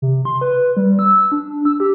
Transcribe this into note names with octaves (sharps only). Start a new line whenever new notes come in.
C3
C6
B4
G3
E6
D4
E6
G4